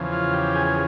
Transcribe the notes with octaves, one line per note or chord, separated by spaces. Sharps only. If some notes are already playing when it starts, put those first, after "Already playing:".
Already playing: E2 C#3 F3
F4
G4
G#4
G#4